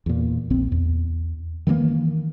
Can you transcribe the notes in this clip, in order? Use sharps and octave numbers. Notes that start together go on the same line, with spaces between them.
E2 A#2
A#1 C4
E2
D#3 E3 A3 A#3